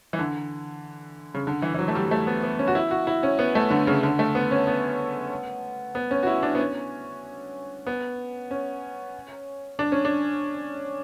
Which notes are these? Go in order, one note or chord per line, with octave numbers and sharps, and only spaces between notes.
E3
D3
C#3
D3
E3
E3
F#3
A3
G3
G3
A3
B3
B3
C#4
F#4
E4
F#4
E4
C#4
B3
A3
D3
C#3
D3
A3
B3
C#4
B3
B3
C#4
F#4
E4
D4
B3
C#4
B3
C#4
D4
C#4
D4